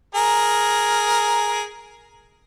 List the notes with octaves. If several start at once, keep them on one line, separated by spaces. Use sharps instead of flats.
G#4 A#4